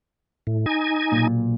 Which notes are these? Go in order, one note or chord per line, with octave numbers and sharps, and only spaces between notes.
A2
D#4 G#5
B1 A#2